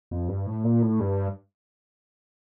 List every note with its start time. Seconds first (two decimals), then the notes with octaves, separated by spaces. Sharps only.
0.11 F2
0.28 G2
0.46 A2
0.64 A#2
0.82 A2
1.00 G2